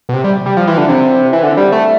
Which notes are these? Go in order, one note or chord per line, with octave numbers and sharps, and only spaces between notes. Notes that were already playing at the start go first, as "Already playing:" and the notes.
B2
C3
G3
G3
F3
E3
D3
C3
E3
D3
G3
A3